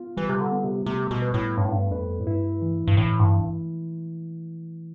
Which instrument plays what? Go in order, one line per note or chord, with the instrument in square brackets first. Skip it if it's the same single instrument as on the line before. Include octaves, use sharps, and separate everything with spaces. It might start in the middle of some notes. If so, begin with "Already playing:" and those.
Already playing: [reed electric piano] B3 F4
[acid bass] E3 [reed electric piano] G3
[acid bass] C3
D3
[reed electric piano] B3
[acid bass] C3
[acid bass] C3 [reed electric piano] A3
[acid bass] B2
[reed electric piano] B4
[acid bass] A2
[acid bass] G2 [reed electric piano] A3
[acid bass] A2
G2
[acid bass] F2 [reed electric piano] B4
[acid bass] A2
[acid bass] G2 [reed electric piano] E4
[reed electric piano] E3
[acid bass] G2
[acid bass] A2 [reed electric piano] E3
[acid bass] G2
[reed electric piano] E3